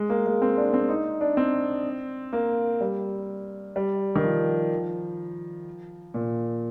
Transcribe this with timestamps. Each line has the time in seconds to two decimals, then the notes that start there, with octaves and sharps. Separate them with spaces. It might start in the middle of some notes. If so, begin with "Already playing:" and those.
Already playing: G#3
0.10 A#3
0.26 G#3
0.42 C4
0.58 D4
0.74 C4
0.89 D#4
1.21 D4
1.37 C4
2.33 A#3
2.81 G3
3.76 G3
4.16 D#3
4.24 F3
6.14 A#2